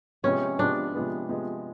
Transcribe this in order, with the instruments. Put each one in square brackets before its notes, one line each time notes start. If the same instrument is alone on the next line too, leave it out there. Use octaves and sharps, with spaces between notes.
[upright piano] C3 F3 G#3 B3 [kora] C#4
[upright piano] C3 F3 G#3 B3 [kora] D4
[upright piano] C3 F3 G#3 B3
C3 F3 G#3 B3